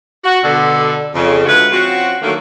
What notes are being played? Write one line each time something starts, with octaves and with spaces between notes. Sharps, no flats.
F#4
B2 D3 A4
F2 C#3
D3 G#3 A3 F4 F#4 B4
F3 C4 C#4 F#4
D3 D#3 F#3 A3 A#3